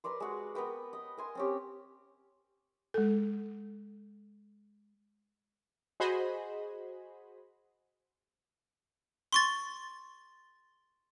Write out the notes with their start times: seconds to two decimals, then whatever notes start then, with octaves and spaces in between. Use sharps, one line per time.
0.04 A#4 B4 D5 C6
0.20 G#3 F#4
0.55 B3 A#4 B4 G5
0.93 D#5
1.17 A#4 G#5 C6
1.35 C4 C#4 G4
2.94 G#3 A4
6.00 F#4 G#4 C5 D#5 B5
9.33 C6 C#6 A6